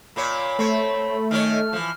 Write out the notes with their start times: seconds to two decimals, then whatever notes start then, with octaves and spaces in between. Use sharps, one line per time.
0.16 A#2 A#3 C#5 B5
0.59 A3 C4 C#5
1.31 D#3 C#4 C#5 F6
1.73 E3 F3